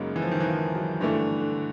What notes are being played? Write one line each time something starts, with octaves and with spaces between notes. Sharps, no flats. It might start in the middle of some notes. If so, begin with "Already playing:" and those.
Already playing: F#2 C#3 F#3 G#3 A#3 D#4
E3
F3
D#3
E3
F3
F#3
G2 D3 E3 A3
D3